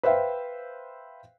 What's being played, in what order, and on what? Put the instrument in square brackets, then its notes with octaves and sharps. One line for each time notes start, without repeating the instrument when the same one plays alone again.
[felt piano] B4 C5 E5 F5 G5